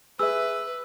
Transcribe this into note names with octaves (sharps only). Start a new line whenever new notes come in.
G#4 B4 E5 E6